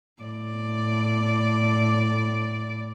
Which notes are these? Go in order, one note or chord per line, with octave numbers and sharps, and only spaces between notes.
A2 D5